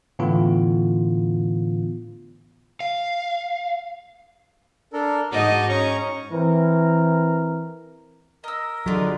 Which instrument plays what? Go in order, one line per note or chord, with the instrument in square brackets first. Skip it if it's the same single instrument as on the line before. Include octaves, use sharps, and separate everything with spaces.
[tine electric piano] A2 D3 E3 B3 F4
[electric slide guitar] F5
[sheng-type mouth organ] D4 A4 A#4
[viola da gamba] G#2 D#4 D#5 [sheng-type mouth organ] F#4 A5 D6
[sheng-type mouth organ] C#4 A#5 C#6
[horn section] E3 C4 A#4
[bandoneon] A#4 [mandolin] D#5 E6
[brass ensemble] D3 G#3 [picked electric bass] F#3 [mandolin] E4 F4